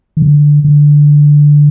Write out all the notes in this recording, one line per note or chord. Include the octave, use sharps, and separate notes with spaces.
D#3
D3
D3